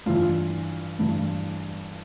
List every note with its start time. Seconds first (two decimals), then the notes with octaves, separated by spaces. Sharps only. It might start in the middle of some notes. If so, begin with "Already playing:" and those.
0.06 G2 E3 F4
0.99 G2 E3